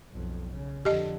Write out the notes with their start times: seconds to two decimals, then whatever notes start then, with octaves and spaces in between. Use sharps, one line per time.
0.11 B1 F2
0.52 C#3
0.85 F2 D3 G4 D#5